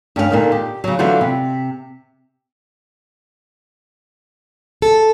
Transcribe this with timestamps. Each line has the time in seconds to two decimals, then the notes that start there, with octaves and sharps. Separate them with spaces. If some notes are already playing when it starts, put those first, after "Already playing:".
0.16 G2 C#4 G#4 F5
0.31 A#2 D3 D#3
0.52 G4
0.84 C#3 F#3
0.99 D3 E3 F#3 F4 F#4 C5
1.21 C3
4.82 A4